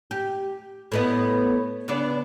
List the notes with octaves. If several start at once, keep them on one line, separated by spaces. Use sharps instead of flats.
G4
A2 B3 D#5
C#3 B3 D4